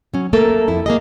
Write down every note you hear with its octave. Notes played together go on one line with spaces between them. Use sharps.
F#3 C#4
A3 A#3 A4 A#4
F2 E4
A#3 G#4 D#5